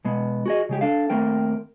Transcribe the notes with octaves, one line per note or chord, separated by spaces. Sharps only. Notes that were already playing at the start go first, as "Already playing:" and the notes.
B2 G#3 B3
F#4 G#4 D#5
C#3 G#3 G4
D4 A4 F5
D#2 A3 C4 A#4 G5